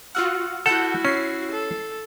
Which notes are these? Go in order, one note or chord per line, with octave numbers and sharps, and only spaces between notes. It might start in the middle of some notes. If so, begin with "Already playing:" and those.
F4 F#4 F#5 E6 F6
E4 F#4 A4 F#5 G6
C#4 C7
A4